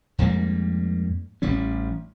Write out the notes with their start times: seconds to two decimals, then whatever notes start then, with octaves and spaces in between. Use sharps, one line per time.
0.18 F2 G#2 G3 A#3
1.42 A1 E3 G3 C#4